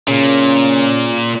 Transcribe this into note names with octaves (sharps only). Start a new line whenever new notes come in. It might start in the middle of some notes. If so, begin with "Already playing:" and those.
A#2 C#3